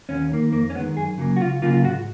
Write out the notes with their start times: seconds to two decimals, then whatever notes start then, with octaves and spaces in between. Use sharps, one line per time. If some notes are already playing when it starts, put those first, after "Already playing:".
0.09 D#2 C#4
0.31 D#3 A#3
0.52 F2 A#3
0.70 C#4
0.75 G#3 B3
0.79 D#3
0.97 F#2 G#4
1.18 C#3 F#3 A#3
1.36 F#4
1.41 C#2 F4
1.62 C#3 F#3 A#3 F4
1.74 F4
1.84 G#2 F#4